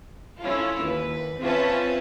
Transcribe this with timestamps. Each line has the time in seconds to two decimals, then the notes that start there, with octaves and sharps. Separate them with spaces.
0.41 C#4 E4 F4 A4
0.84 D#2 B4
1.41 C4 C#4 F4 B4 E5 A5